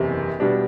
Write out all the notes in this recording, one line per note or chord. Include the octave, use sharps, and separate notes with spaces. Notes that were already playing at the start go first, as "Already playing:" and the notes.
Already playing: F#1 E2 C3
B2 G3 D4